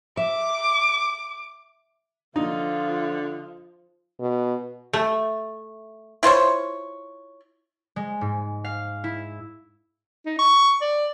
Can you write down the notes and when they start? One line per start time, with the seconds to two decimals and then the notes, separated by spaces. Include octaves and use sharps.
0.17 E5 D6
2.36 D3 F3 D#4 F4
4.20 B2
4.93 A3
6.23 E4 F4 C5 C#5
7.96 G#3
8.21 G#2
8.64 F5
9.04 E4
10.26 D#4
10.39 C#6
10.81 D5